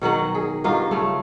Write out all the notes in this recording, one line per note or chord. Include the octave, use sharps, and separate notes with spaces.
B2 D#3 F#3 F#5
G#4
G2 F#3 D#4 F4
C#3 A3